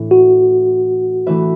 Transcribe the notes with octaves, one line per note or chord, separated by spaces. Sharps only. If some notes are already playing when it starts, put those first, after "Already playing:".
Already playing: A2 E3 D4
F#4
E3 A3 D4 B4 E5